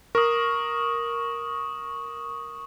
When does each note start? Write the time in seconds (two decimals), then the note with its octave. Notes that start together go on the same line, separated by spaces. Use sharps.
0.15 A#4 C#6 D#6